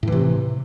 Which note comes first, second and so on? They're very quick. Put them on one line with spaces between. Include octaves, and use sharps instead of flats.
A2 E3 C3